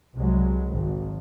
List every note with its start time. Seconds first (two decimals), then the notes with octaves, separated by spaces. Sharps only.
0.16 C2 F#3 G#3
0.71 G#1